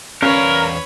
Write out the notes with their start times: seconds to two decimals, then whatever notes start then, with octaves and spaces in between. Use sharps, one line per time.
0.22 E2 C#4 A#4 B4 C#5 D5 F5